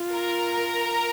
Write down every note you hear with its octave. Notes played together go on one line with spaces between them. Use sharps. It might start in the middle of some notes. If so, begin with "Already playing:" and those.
Already playing: F4
A#4 A#5